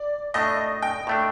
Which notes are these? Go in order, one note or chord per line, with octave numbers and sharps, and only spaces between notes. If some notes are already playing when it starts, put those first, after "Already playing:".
Already playing: D5
A2 A3 D4 D#5
G5
A2 A3 D4